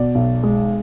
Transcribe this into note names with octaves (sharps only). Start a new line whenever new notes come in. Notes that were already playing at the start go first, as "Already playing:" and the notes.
Already playing: B2 D5
B1
G#3